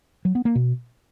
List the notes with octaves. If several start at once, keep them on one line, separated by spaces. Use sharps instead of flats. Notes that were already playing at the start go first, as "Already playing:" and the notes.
F#3
B3
A#3
B2